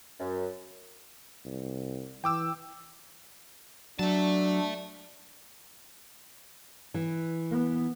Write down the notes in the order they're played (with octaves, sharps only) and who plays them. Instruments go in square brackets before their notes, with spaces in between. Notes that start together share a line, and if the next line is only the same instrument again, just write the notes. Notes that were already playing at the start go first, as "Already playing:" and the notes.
[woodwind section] F#2
[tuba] C2
[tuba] E3 [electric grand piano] G5 D6 E6
[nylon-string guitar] F#3 [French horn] D4 [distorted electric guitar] E5 A5
[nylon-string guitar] E3
[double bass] B3